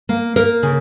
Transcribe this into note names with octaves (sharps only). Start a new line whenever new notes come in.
A#3
A#3 A#4
C#3